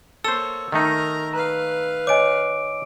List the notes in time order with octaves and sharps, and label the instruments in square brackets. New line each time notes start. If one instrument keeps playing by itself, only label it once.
[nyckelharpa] A#3 C#5 [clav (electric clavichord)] A4 C5 [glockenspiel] E6
[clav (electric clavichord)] D#3 A3 D#4 [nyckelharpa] A#4 A#5
[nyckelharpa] B4 F5 [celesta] A#5
[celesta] C#5 D#5 G#5 [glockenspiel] D6 D7